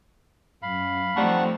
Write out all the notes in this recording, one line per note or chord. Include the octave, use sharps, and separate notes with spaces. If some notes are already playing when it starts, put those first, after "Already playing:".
F#2 F5 B5
D#3 F3 G3 A3 C4 F#5 A5 C#6